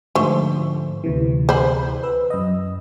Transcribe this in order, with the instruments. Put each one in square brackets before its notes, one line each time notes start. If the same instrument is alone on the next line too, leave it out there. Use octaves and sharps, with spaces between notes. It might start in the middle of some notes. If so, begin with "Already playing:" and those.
[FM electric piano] G#2 D3 F3 [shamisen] A3 C5
[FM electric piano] D2 C3 E3
[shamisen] C5 B5
[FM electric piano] B4 E6
F#2 D#5